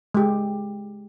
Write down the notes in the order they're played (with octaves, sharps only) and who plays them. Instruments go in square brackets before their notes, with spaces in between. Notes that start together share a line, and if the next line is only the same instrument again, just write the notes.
[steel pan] G#3 G4